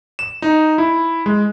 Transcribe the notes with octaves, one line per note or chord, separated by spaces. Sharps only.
E7
D#4
E4
G#3